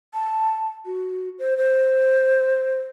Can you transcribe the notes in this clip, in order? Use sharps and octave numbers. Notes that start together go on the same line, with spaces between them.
A5
F#4
C5
C5